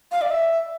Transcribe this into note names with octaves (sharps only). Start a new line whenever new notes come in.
F5
D5
E5